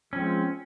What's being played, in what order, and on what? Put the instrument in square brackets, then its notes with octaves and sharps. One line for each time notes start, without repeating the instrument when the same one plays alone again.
[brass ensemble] F3 G#3 C4 F4 [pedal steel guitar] C#4